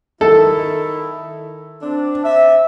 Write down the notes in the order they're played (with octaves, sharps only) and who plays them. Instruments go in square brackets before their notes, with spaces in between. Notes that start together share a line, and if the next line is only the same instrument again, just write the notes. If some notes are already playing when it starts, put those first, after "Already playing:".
[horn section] D#3 E4 [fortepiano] A4
[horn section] C4 D4
C5 D5 E5